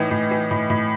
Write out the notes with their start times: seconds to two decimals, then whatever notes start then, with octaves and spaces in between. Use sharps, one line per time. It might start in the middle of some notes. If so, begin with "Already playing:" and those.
Already playing: A2 E3 D#4
0.11 A2
0.31 E3
0.51 A2
0.70 A2